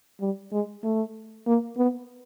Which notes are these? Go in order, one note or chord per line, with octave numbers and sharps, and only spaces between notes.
G3
G#3
A3
A#3
B3